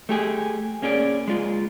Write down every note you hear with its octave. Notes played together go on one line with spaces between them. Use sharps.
A3 G4 G#4
A#3 C#4 G#4 D5
G#3 F4